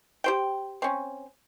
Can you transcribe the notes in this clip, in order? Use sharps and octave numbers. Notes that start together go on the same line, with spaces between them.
G4 C5 G5
C4 C#4